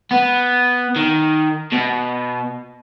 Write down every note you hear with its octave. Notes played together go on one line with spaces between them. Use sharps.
B3
D#3
B2